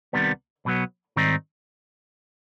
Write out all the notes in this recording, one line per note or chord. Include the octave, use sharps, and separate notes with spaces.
C2 C3 D#3 G3 B3
B1 B2 F#3 B3
G#2 D#3 G3 C4 D#4